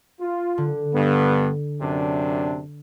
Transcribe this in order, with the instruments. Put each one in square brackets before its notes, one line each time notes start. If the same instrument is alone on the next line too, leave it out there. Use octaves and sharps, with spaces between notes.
[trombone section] F4
[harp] D3
[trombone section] G2 B3
F#2 C3 D4